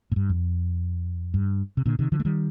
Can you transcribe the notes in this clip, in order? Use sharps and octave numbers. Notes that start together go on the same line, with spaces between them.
A2
G2
F2
G2
C3
A#2 D3
C3 D#3
D3 F3
A3
D#3 G3